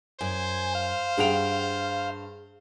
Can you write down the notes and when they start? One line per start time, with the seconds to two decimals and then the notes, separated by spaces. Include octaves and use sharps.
0.21 F#2 C5 G#5
0.75 F5
1.17 G2 G#4 F#5 G5 F7